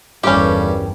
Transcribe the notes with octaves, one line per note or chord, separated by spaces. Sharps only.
G1 E2 G2 A#3 C#4 D#4 G4 A4